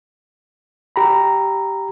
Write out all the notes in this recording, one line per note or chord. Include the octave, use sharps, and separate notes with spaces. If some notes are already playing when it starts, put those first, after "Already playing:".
G4 A#5 B5